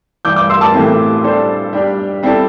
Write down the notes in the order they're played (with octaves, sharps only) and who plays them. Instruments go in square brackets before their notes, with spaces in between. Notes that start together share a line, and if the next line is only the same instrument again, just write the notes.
[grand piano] G2 E3 G3 [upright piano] D6 G6
[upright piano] D6 G6
C6 E6
A5 D6
[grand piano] A2 E3 A3 C4
G3 D4 A4 C5
G3 D4 G4
G3 C4 E4 A4 D5